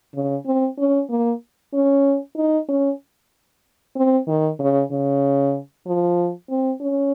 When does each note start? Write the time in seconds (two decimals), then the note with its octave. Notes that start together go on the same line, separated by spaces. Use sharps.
0.14 C#3
0.46 C4
0.79 C#4
1.10 A#3
1.73 C#4
2.36 D#4
2.69 C#4
3.96 C4
4.28 D#3
4.59 C#3
4.91 C#3
5.86 F3
6.50 C4
6.81 C#4